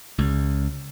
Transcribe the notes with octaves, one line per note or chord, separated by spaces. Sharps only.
C#2